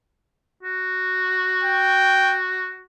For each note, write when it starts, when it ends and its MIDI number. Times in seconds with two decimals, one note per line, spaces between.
0.63 2.82 66
1.64 2.38 79